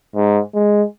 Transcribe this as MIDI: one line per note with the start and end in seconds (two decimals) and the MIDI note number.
0.16 0.39 44
0.55 0.82 56